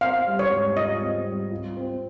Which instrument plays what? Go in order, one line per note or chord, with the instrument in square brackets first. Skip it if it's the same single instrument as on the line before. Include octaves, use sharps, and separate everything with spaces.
[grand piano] C4 [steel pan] F5
[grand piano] G3
[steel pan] C#5
[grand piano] G#2
[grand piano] F4 [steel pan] D#5
[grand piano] C4
G3
F4
C4